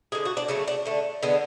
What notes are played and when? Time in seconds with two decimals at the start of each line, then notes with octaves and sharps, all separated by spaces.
0.12 D3 G#3 G#4
0.25 F#4
0.37 D4
0.48 C#3 F#3 A3 C#4
0.68 D4
0.85 D3 A3
1.23 D3 G#3 B3